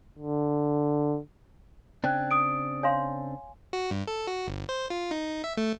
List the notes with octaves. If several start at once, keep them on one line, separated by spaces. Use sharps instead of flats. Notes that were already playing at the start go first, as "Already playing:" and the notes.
D3
C#3 C4 D4 G5 F#6 G#6
D#6 D7
C#5 F5 G#5 C6
F#4
G2
A4
F#4
G1
C5
F4
D#4
E5
A3